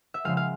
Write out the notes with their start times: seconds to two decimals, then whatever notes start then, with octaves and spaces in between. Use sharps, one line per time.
0.14 E5
0.25 C#3 F3 G#3 F5
0.37 F5